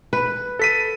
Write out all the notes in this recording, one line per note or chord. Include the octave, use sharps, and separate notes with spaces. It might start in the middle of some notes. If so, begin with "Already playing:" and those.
B4
A4 B6 D#7